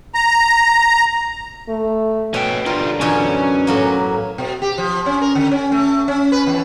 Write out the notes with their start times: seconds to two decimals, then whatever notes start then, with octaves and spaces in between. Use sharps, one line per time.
0.15 A#5
1.69 A3
2.34 B2 C#4 E5 G5
2.66 D3 G3 F4 A#4
3.01 F#2 B2 E3 C#4
3.67 A2 F#3 A#3
4.38 B2
4.62 G4
4.78 F3
5.06 C#4
5.21 A#4
5.35 D3
5.51 C#4
5.72 A3
6.08 C#4
6.32 B4
6.46 E2